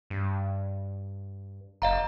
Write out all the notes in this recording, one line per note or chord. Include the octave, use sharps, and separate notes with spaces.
G2
F#1 D#5 F5 A#5